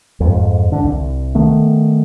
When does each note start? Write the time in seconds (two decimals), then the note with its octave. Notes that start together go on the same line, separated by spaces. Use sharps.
0.20 F2 G#2
0.72 D3
0.84 C2
1.35 D#3 A3 B3